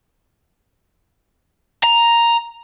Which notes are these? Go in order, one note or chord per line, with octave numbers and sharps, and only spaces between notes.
A#5